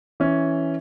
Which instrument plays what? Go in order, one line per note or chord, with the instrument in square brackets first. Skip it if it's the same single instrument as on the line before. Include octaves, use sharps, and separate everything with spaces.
[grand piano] E3 C#4